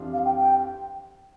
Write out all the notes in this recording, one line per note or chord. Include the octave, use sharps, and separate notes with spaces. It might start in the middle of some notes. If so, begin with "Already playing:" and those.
Already playing: F2 E3 G3 D4 F4
F5
G5
G5